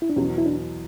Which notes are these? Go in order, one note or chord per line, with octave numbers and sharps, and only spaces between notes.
E4
D4
E2 B2 F#3 C#4
E4
D4